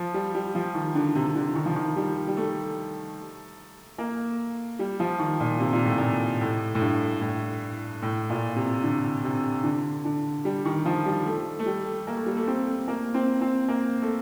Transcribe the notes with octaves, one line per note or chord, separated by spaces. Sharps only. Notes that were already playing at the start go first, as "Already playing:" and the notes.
Already playing: F3
G3
G3
F3
D#3
D3
C3
C3
D3
D#3
F3
D#3
G3
G3
A3
A#3
G3
F3
D#3
A#2
C3
A#2
A2
A#2
A2
A2
G2
A2
A2
A#2
C3
D3
C3
D3
D3
G3
D#3
F3
G3
A3
A3
G3
A#3
A3
G3
A3
C4
A#3
C4
C4
A#3
A3